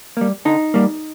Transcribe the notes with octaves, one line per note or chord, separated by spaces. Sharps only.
G3 A#3
D3 D#4
G3 A#3